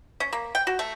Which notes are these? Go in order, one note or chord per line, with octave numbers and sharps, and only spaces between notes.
C#4
A#3
G5
F#4
A3